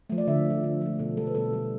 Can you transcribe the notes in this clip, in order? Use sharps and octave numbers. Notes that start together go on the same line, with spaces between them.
F3 A3
D5
D3 E5
F3 A3
D3
F3 A3
B2 A4
G3 A4
B4
B2 A4
G3